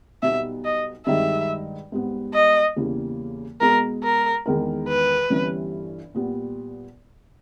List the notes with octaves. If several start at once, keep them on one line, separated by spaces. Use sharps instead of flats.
B1 B2 G3 B3 D#4 E5
D#5
G2 D#3 G#3 D#4 E5
G#2 G3 B3
D#5
E2 C#3 G3 A#3 E4
B2 G#3 B3 A#4
A#4
E2 D#3 G#3 D#4 A#4
B4
G1 G2 E3 G3 C#4
A#2 G3 B3